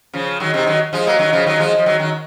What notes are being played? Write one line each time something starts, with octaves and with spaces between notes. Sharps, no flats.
C#3 F3
D#3 F#3
C3 D#3
D#3 F#3
F3 G#3
F#3 A#3
D#3 F#3
C#3 F3
D#3 F#3
F3 G#3
F3
D#3 F#3
D#3 F#3